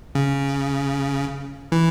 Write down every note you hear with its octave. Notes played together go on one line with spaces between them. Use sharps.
C#3
E3